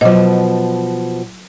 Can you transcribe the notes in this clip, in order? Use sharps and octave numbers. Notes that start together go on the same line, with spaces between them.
B2 F3 F#3 D#5